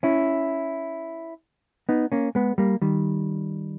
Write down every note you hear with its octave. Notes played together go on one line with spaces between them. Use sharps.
C#4 E4
B3 D#4
A#3 C#4
G#3 B3
G3 A#3
D#3 G3